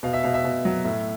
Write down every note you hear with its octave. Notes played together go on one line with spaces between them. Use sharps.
B2 F5
E5
B2 F5
E5
B2
F#3
A2